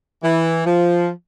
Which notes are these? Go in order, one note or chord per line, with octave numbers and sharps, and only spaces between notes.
E3
F3